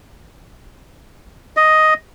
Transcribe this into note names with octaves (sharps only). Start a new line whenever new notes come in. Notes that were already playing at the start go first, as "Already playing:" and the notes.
D#5